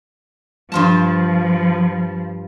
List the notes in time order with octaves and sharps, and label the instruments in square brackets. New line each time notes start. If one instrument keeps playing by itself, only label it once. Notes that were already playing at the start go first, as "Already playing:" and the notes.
[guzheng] G2 F4 A5 [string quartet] F3